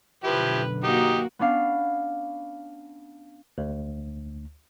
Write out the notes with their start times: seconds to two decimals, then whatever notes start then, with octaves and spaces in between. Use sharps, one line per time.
0.24 B1 F#2 D3 F3 E4 G4 B4
0.84 A#3 D#4 F#4 G4
1.39 B3 C#4 D4 F5
3.58 D2